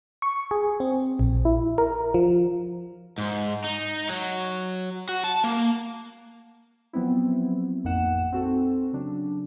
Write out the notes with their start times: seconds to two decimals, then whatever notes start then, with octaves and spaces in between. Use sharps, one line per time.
0.22 C#6
0.51 G#4
0.80 C4
1.19 A#1
1.45 E4
1.78 A#4
2.14 F3
3.18 G#2
3.64 D#4
4.09 F#3
5.09 F#4
5.24 A5
5.44 A#3
6.93 F3 F#3 B3 C4 E4
7.84 A1 F2 A#3 D#4 F#5 E7
8.32 C4 F#4 A4
8.93 C#3 F#3 D4